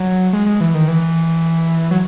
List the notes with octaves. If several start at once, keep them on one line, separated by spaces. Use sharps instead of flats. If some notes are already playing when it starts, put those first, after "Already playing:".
Already playing: F#3
G#3
G#3
E3
D#3
E3
F#3